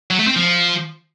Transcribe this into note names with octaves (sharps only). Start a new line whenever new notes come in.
F#3
A3
C4
F3